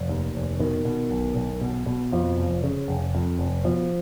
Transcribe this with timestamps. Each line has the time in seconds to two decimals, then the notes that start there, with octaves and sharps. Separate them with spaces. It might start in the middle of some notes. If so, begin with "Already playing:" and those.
Already playing: F1
0.09 D#2
0.35 F1
0.60 B2 D#3
0.85 B2
1.11 B1
1.35 B1
1.61 B2
1.86 B2
2.12 F2 F3
2.38 F1
2.64 C#3
2.88 F1
3.15 F2
3.39 F1
3.64 B2 F3